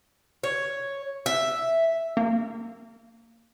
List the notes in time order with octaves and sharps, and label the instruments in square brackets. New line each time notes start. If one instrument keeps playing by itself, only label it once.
[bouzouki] C#5
E5
[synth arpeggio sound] A#3